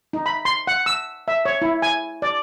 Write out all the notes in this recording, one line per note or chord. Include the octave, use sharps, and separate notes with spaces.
D#4
B5
C6
F#5
E6
E5
C#5
E4
G#5
D5